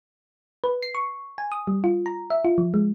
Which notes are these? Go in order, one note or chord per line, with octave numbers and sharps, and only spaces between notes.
B4
C7
C#6
G#5
D#6
G3
F4
A#5
E5
F4
F3
G#3